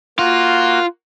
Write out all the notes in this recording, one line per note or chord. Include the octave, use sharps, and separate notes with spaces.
A#3 F4 F#4